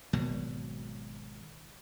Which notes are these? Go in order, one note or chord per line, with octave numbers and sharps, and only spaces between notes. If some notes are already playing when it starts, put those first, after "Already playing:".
G#1 B2 F#3